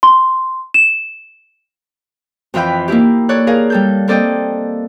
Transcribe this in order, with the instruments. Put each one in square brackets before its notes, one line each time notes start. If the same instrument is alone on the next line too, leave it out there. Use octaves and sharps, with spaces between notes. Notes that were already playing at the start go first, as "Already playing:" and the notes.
[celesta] C6
E7
[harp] F2 E3 F4 E5 G5 B5
A#3 D#4 E4 G4
A4 C#5 D5 F#6
G#4 A#4 F5
G3 A4 G6
A#3 C4 A4 D5 D#5 G5